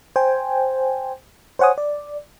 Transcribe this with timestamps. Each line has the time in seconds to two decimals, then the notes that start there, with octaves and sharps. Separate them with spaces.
0.16 C5 G5 G#5
1.59 C5 C#5 F#5 G#5 D#6
1.78 D5